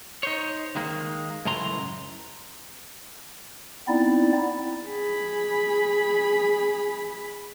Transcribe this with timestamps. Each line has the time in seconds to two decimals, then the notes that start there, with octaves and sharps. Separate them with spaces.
0.23 D#4 C5 C#5
0.76 D#3 G#3 A#3
1.45 C#2 F#2 A2 E3 A#5 C6
3.88 B3 C4 D#4 E4 D5
4.87 G#4 B5